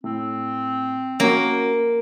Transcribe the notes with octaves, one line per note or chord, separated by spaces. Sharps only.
A2 C4
A#3 C#4 F#4